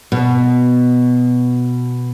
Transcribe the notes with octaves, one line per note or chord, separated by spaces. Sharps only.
B2